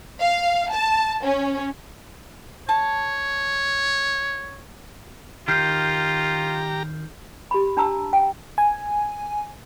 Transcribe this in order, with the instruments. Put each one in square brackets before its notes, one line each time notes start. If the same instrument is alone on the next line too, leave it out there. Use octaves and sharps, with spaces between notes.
[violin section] F5
A5
C#4
[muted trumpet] C#5 [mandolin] A5
[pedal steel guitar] D#3 [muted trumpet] F4 [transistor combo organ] G4 A#5 [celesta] F6 G6 C7
[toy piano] G4 B5
D4 A5 A#5 E6
G5
[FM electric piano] G#5